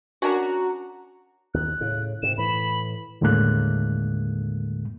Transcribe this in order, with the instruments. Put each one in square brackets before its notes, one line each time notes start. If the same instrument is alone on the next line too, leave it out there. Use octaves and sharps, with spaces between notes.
[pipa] C#4 D4 A#4 [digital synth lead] F#4
[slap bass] D#2 [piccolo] F#6
[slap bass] A2 C#3
[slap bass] G#2 C3 [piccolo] E7
[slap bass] A2 E3 [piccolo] B5
[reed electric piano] D#2 A2 D3 G#3 A#3 F#6